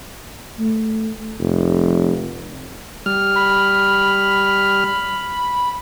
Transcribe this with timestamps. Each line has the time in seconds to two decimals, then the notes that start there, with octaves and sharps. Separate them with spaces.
0.59 A3
1.39 F1
3.06 G3 F6
3.35 B5